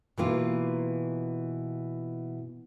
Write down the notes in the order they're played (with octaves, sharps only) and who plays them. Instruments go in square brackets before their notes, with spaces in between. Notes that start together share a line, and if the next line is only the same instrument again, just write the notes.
[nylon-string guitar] B2 E3 A#3 F4